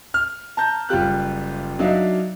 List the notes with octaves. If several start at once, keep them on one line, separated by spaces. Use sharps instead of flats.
F6
A5 A#5 G6
F#1 G3 F4 G4 F#6
F#3 D4 D#4 F#4 E5 F5